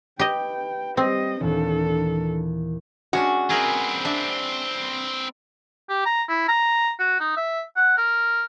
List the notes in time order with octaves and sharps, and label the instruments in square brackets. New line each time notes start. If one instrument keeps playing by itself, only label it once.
[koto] G4 D#5 [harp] B4 [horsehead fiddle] G5
[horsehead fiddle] G3 D#5 [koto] C4 [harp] G5 D#6 C7
[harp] D#2 A#2 E3 [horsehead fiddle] D4 A4
[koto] G#3 C#4 D4 [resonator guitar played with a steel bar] F#4
[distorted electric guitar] C4 B4 [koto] G#4 A#4 E5
[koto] D4 E5
[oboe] G4
A#5
E4
A#5
F#4
D#4
E5
F#5
A#4